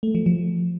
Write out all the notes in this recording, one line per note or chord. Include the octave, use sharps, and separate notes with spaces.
A3
F3
F3